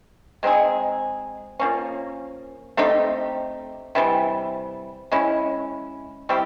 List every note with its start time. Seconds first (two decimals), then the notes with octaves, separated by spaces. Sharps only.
0.43 G#3 C4 D#4 G#4
1.59 F3 A#3 C#4
2.77 A3 C4 D#4 G4
3.95 C3 E3 G3
5.12 G#3 C#4 E4
6.29 G3 C4 E4 G4